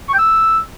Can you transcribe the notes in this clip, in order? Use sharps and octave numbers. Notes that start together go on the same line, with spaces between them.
C#6
G5
E6